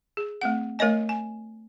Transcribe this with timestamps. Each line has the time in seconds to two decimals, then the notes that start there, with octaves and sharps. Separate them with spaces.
0.17 G#4
0.41 A3 C4 F#5
0.79 A3 A#4 C#5 D#5 G#5
1.09 G#5